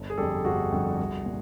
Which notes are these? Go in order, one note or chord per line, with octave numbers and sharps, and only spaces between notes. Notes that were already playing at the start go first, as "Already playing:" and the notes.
Already playing: G1
G#4
F2 D3 G3 G4 A4
G1 F#4 G#4
F2 D3 G3
C2
A#2